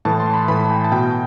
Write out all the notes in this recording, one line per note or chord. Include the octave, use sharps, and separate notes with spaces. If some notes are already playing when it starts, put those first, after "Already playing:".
A2 E3 A5
C6
B5
A2 E3 B5
A5
G5
A5
B2 G5